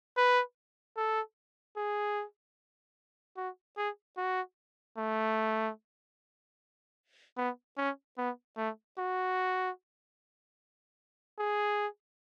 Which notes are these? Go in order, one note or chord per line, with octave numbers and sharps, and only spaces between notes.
B4
A4
G#4
F#4
G#4
F#4
A3
B3
C#4
B3
A3
F#4
G#4